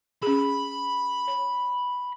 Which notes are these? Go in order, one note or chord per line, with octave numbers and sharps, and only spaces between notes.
C#4 G#4 B5
C#5